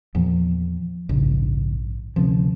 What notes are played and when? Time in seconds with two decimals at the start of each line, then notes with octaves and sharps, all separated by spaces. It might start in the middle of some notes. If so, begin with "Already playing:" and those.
0.15 E2 A#2 F3
1.09 D#1 A#1 G#2 C#3
2.16 D2 C3 F3 C#4